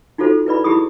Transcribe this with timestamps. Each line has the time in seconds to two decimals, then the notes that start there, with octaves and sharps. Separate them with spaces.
0.18 D#4 F4 F#4 A4 C5
0.46 E4 B4 D5 B5
0.64 E4 G4 G#4 B5 D#6